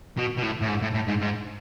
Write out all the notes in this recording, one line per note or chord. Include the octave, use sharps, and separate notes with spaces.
B2
B2
A2
A2
G#2
A2
A2
G#2
G#2